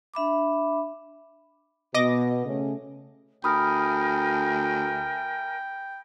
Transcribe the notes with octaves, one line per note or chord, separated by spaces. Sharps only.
D4 E5 B5 D6
B2 D#5 D6 A#6
C#3 A3 C#4
D2 A#4 E5 G5 G#5 B5 D#6 F6